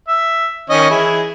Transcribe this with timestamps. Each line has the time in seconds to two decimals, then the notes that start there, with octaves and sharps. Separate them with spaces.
0.08 E5
0.70 D#3 C#4 D#5
0.90 E3 E4 G#4